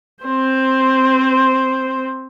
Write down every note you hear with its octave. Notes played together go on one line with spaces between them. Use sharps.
C4 C5